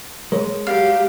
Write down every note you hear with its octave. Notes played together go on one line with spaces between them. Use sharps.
G#3 A#4 C#5
F#3 G4 F5